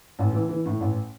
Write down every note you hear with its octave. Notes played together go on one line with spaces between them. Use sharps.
A1
E3
E3
A2
A1